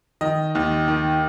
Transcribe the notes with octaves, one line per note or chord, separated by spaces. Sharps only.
D#3 D#5
D#2
D#3